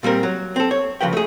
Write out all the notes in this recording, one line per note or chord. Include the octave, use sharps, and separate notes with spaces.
A#2 G3 C4 A#4
F#3
C4 A4
C#5
C#3 F3 F#4 B4 G5
A3 G#4